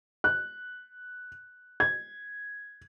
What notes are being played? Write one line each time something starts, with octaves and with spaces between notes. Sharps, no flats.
F#6
G#6